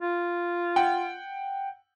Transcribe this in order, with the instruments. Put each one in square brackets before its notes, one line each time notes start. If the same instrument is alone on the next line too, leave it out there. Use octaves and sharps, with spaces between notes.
[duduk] F4
[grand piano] F#5 G5